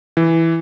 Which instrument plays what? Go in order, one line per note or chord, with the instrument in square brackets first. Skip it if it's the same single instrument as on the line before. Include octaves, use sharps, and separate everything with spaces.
[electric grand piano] E3